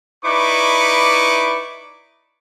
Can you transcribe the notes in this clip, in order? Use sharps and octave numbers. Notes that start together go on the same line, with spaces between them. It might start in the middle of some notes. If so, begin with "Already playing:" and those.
D#4 E4 B4 D5 C#6 D6